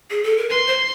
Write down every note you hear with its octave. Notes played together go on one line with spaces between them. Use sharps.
G#4
A4
A#4
B4 C6
C5